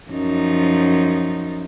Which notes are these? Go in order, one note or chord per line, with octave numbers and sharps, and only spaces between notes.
F#2 F3 D#4